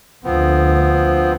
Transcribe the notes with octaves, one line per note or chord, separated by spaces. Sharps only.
D2 F3 B3 C4